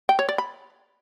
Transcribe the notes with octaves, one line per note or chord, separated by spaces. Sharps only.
G5
C#5
D5
B5